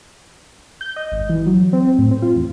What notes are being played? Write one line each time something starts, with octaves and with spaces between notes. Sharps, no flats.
G6
D#5
G#1
E3
F#3
C4
A2
C4
F4
E2